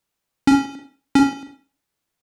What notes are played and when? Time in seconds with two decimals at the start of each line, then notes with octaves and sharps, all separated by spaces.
0.47 C#4
1.15 C#4